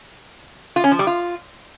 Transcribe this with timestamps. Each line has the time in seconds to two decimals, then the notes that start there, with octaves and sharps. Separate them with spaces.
0.76 F4
0.84 C#4
0.92 F3
0.99 G3
1.07 F4